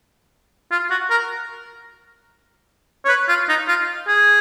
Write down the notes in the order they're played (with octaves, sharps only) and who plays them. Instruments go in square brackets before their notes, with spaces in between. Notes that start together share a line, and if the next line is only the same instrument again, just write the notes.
[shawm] F4
F#4
A#4
C#5
B4
F4
D#4
F4
G#4